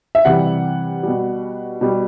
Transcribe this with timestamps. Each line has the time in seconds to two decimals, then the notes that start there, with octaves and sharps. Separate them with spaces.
0.15 E5
0.25 C3 E3 G3 F#5
1.03 B2 G3
1.81 B2 G3